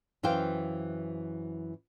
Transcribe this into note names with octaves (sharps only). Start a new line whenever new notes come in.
F#2 E3 C5 F5 G5